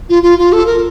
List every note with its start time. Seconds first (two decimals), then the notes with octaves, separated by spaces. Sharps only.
0.09 F4
0.23 F4
0.38 F4
0.52 A4
0.66 A#4